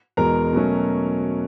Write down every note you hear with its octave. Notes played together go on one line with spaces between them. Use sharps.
E2 B2 G#3 A#4 A#5
B2 F#3 A3 C#4